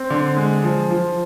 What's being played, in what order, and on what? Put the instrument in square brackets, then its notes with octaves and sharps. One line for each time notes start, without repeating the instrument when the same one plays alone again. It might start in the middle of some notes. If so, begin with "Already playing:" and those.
Already playing: [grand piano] C4
D3
G#3
F3
F3